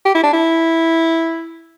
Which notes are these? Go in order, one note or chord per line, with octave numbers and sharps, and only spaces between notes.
G4
E4
D4
E4